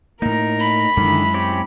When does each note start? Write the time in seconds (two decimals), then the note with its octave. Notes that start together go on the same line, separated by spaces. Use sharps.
0.22 A2 A#3 D#4 A#4
0.60 B5
0.97 F#2 D3 D#3 G#3 E4
1.34 C4 C#4 G4